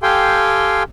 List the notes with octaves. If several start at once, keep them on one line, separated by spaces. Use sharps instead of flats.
G4 A4 F5 G5 G#5 C6